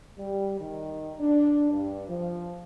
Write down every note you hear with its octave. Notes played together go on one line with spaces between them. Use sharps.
G3
D#3
D4
G2
F3